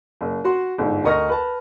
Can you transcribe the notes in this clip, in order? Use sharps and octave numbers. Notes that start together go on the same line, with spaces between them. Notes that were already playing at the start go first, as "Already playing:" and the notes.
F#1
F#4 F#5 C6
G1 G#2
D2 A#4 D#5 C#6 F6 A#6
B4 A5